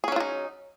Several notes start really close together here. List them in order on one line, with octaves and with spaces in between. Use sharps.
G#4 C#4 F#3 F4 D#4